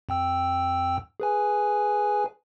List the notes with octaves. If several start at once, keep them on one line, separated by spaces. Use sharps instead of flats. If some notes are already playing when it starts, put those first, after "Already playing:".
F2 G5 E6
G#4 B4 G#5